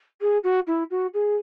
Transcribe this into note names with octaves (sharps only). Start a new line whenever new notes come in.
G#4
F#4
E4
F#4
G#4